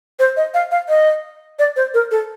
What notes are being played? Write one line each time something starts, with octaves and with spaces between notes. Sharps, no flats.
C5
D#5
F5
F5
D#5
D5
C5
A#4
A4